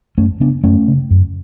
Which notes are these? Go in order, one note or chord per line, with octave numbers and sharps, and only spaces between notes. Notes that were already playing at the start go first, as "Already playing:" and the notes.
F#2 A3 C#4
C#3 B3 D4
F#2 A3 C#4
C#3
F#2